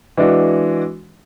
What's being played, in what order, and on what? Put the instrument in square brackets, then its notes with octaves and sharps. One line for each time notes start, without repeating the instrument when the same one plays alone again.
[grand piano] E3 G#3 D4 F#4